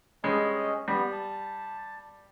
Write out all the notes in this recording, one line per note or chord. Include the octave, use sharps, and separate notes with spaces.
G2 G#3 C#4 D#5
G3 B3
A5